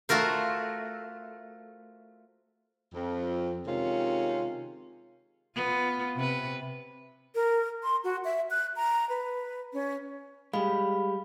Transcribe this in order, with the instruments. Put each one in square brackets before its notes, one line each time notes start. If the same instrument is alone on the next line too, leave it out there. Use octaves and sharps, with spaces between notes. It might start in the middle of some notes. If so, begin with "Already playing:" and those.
[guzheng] A3 F4 F#4 A#4 C5
[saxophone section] F2
C3 D#3 G#3 C#4 F4
[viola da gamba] B3 F4
C3 B4
[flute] A#4
C6
F#4
E5
F#6
A#5
B4
C#4
[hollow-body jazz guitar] G3 G#3 [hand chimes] F5 B5